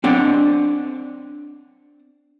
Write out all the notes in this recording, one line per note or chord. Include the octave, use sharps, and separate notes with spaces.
C4 D4 D5 F#5